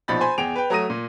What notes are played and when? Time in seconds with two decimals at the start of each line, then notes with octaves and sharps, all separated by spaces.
0.08 A#1 B2 F3 D#4 B5 A6
0.21 C5 G#5 B5 C6
0.38 E2 G#4 G5 D7 F7
0.56 B4 G5
0.70 F#3 A3 A#5 D#6 A#6 D#7
0.90 A#2